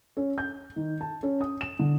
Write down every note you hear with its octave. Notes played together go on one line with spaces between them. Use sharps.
C#4
G6
D#3
A5
C#4
D#6
E7
D3